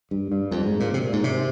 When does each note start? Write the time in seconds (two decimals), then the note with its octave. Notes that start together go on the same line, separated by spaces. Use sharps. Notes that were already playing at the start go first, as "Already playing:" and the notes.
0.11 G2
0.32 G2
0.51 F2
0.66 G#2
0.80 A#2
0.94 C3
1.04 A#2
1.13 G#2
1.24 C3